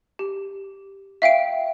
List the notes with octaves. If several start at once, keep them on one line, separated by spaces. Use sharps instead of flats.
G4
E5 F5 G5 D7